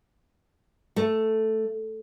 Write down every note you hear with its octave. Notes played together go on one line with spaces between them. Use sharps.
A3